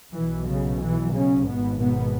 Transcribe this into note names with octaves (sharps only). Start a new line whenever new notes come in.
B1 B2 E3
C#3
E3
C#3 C#4
G#1 G#2 B2 B3
B2 B3